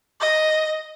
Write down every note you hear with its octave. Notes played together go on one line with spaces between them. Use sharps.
D#5